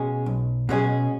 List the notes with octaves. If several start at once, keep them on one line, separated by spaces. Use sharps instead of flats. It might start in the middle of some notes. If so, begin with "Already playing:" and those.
Already playing: B2 G#3 C#4 G#4
B1
B2 G#3 C#4 G#4